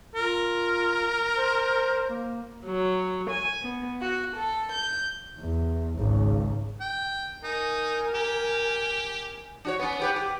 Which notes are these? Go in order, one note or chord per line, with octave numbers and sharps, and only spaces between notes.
F4 A#4
C5
A#3
F#3
G#5
B3
F#4
A4
G6
E2
G#1 C#2
G5
D#4 A#4 G#5
G4
D4 F#4 C#5
B3 C#4
B3 G4 B4
G4